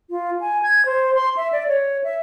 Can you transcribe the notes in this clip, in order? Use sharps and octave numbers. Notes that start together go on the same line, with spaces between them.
F4
G#5
G#6
C5
C6
E5
D5
C#5
E5